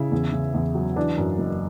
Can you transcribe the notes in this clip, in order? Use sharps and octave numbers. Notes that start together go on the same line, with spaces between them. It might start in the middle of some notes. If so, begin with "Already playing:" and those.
Already playing: C#3 E4
E2
C#3
E2
F#3
E3 D4
F#2
F#1